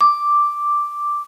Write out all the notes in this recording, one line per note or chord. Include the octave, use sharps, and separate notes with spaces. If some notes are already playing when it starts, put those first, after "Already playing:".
D6